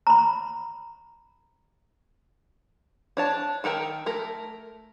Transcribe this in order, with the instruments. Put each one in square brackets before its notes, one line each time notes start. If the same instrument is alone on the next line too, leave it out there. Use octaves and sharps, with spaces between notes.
[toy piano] A#5 B5
[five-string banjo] D4 C#5 A5
D#3 A4 A#4 G5
A3 A#4